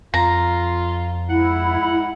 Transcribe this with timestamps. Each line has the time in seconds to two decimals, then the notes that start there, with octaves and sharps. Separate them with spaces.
0.14 F2 F4 A#5
1.28 G#2 E4 F#5